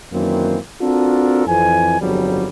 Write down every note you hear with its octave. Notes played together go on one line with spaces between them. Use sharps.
F#2 D#3 E3 A#3 C4
C4 D4 F4 F#4 A4 A#4
F2 E3 G#5
G1 F2 C#3 F#3 G3